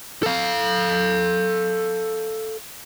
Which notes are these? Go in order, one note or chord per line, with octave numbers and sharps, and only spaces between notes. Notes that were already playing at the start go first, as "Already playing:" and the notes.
A4 F5